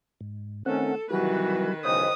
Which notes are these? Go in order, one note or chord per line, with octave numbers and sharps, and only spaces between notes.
G#2
D#3 A3 C4 C#4 A4 F#5
C3 D#3 E3 F#3 G3 F#4 B4
B1 E2 C#3 C5 D#5 G5 D#6